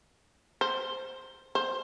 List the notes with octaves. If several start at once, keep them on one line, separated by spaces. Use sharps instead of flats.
C5
C5